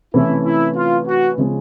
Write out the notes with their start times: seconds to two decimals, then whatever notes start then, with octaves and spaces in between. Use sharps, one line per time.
0.14 C3 E3 A3 C#4 E4
0.46 E4
0.76 F4
1.07 F#4
1.38 C#3 F3 G#3 C#4